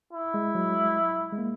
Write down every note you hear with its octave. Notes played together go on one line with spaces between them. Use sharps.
E4
G#3
F#3
G#3
A#3